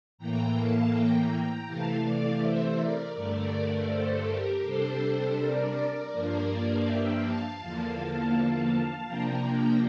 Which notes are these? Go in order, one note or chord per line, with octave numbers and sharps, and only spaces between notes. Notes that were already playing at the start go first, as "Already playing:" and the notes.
A2 E3 A#3 G5 A#5
F5 A5
G5 A#5
C3 E3 A3 F5 A5
D5 F5
C5 E5
A#4 D5
G2 D3 A3 A#4 D5
A4 C5
G4 A#4
C3 G3 D4 A4 C5
A#4 D5
G2 F3 A#3 D4
E5 G5
F5 A5
E2 D3 F3 A#3
C3 F3 A#3 D4 G5 A#5